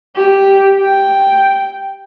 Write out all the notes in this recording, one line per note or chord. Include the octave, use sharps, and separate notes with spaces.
G4
G5